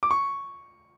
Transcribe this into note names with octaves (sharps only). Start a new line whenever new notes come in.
D6
C#6